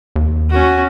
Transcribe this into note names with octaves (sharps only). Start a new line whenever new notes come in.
D#2
C#4 F#4